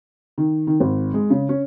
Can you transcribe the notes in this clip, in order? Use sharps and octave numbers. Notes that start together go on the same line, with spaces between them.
D#3
D#3
G#1
G#3
C#3
C#4